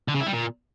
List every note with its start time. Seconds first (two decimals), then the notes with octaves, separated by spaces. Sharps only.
0.08 D3
0.14 C#3
0.21 E4
0.27 G3
0.33 A#2